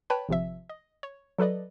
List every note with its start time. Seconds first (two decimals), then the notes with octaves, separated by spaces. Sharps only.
0.10 B4 C#5 G5 A5 B5
0.29 G#1 C3 F3 E5
0.69 D#5
1.03 C#5
1.38 F#3 A4 B4 D5 D#5